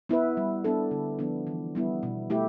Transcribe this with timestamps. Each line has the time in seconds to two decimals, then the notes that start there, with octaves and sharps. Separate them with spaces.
0.09 B3 E4 B4
0.37 G3
0.64 B3 D4 A4
0.91 D3
1.19 F3 B3 D4
1.47 E3
1.75 G3 B3 E4
2.03 B2
2.30 A3 E4 G4